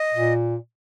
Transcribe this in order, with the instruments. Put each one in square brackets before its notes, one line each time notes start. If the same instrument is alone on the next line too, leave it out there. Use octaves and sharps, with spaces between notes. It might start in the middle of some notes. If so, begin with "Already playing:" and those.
Already playing: [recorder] D#5
[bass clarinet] A#2